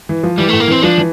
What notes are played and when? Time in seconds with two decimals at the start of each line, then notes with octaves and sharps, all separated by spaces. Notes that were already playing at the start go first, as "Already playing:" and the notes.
0.09 E3
0.23 F3
0.38 E3 G3
0.49 A2 A3
0.60 A#3
0.68 E3 C4
0.83 F3 D4
0.98 E3